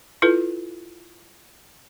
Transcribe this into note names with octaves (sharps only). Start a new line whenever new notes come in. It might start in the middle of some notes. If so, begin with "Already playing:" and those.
E4 F4 A4 B4